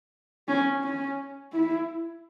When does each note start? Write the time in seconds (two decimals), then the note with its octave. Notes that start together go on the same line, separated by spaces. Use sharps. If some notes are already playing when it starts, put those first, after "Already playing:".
0.48 C#4
0.83 C#4
1.52 E4